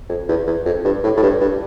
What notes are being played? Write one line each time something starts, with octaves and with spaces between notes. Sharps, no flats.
F2
E2
E2
F2
G2
A2
A2
G2
G2